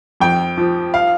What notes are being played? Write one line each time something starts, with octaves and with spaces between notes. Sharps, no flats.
F2 G5
F3
F5